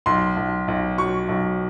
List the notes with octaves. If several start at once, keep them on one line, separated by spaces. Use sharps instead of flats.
B1 C6
B1
B1
F#3 C#6
B1